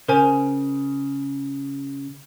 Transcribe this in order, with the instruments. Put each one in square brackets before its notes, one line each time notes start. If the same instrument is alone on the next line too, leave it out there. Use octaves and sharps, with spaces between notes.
[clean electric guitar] C#3 [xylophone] A#4 C5 G#5